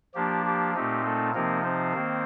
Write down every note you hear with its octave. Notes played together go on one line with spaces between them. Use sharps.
F3 A#3 D4 G4
G4
A#2 A3 C4 D#4 G4
A3 A4
C3 F3 A#3 C4 D#4 A#4
C4 C5
D#3 A#3